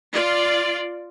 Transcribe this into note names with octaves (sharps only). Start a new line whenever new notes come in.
F4 D5